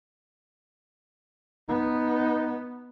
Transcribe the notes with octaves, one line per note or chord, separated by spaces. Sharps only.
B3 D#4